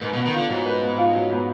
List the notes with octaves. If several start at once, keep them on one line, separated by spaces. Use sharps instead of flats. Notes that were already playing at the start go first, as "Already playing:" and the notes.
G#2 B4
B2
B3
D#3
D3 F4
G#2 F#3
B4
B3
F4
F#3
B3